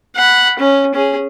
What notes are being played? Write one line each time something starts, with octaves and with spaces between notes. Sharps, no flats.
F#5 B5
C#4
C#4 G#4